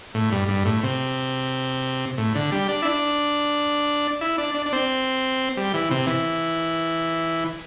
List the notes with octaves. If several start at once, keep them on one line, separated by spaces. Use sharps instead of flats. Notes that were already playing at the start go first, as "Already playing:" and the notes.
A2
G2
G2
A2
C3
A2
D3
G3
D4
E4
D4
E4
D4
D4
D4
C4
G3
E3
C3
E3